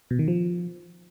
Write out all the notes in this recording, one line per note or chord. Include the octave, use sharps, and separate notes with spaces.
B2
D#3
F3